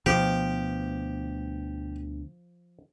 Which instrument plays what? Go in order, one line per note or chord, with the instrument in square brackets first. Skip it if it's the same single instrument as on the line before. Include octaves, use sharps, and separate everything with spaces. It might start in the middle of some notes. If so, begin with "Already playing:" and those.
[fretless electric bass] D2 B2 B3 [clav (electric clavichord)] F3 [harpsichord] G4